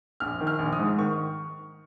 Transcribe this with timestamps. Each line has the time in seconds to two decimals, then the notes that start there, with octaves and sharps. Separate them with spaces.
0.20 A#1 F6
0.40 D#3
0.47 F6
0.59 A#1
0.73 D#6
0.79 G#2
0.98 D#3 C#6